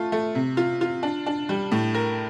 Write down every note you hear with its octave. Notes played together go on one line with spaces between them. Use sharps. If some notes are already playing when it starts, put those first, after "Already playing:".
Already playing: A3 F4 A4
A3
C3
F4
F4
D4
D4
G3
A2
A#4